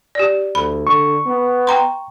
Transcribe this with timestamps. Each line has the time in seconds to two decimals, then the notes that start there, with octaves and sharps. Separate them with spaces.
0.15 G4 D5
0.55 D2 B5
0.87 D3 C#6
1.26 B3
1.67 G5 A#5 C6